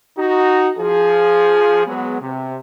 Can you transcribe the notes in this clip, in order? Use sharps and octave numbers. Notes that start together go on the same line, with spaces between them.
D#4 F#4
F3 G#4
F#3 G#3 B3
C3